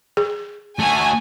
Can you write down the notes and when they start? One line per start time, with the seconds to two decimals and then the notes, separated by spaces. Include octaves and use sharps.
0.17 G#4
0.79 A3 F#4 G#5